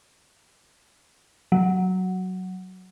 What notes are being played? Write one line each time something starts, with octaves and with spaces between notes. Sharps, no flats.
F#3